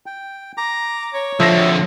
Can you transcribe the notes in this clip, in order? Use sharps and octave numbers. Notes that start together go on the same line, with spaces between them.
G5
A#5 D6
C#5
D3 F3 C4 A4 E5 A#6